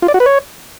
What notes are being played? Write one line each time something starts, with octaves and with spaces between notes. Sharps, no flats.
F4
D5
F#4
B4
C#5